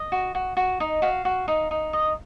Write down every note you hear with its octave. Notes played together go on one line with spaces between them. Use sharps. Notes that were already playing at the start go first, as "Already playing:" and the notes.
Already playing: D#5
F#4
F#4
F#4
D#4
F#4 F5
F#4
D#4
D#4
D#5